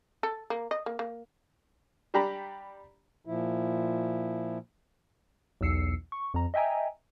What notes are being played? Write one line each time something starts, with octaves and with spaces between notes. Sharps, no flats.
A4
A#3
D#5
A#3
A#3
G3 D4 G4 A#5 B5
A#2 F3 E4
B1 E2 E6 C7 C#7
C#6
F2 A#5
D#5 E5 G5 G#5 A#5